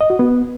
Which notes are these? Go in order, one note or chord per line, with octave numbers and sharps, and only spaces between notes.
D#5
F#4
B3